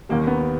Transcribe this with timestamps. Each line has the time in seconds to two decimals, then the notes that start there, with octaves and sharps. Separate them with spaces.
0.09 D#2 D#3 G3 A#3
0.27 B3